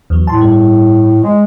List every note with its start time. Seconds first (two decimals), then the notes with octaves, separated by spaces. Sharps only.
0.10 E2 F#3
0.27 A2 A5 C6
0.41 G2 G3
1.23 G#3